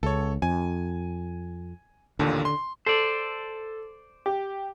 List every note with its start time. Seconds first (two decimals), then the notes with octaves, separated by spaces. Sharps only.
0.03 C#2 A4 C#5
0.42 F2 G#5
2.19 A1 D#2 A#2 D3
2.45 C6
2.86 A4 C5 D5
4.26 G4